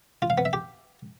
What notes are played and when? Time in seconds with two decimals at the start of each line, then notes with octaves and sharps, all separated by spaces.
0.22 F4
0.30 F5
0.38 B3
0.45 E5
0.53 G4